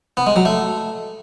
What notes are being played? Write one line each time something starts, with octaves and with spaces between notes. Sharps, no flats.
B3
G#3
F#3
A3